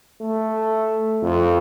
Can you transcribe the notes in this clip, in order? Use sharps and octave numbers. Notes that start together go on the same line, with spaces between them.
A3
F2